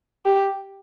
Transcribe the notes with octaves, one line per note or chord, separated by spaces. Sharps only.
G4